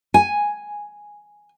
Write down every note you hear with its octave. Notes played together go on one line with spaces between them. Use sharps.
G#5